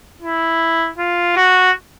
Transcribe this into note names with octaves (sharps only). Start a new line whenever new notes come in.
E4
F4
F#4